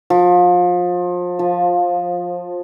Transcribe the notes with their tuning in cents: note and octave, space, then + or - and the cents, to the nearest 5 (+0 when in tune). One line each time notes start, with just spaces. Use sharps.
F3 +30
F3 +15